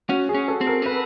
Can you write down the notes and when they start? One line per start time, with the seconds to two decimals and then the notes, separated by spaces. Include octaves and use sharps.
0.09 C#4 F#4
0.29 G#4
0.34 C#4
0.48 A4
0.61 C4
0.67 A#4
0.82 C#4
0.86 C4 B4